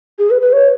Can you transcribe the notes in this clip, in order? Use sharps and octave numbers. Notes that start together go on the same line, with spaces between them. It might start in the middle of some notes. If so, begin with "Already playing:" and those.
G#4
B4
B4
C#5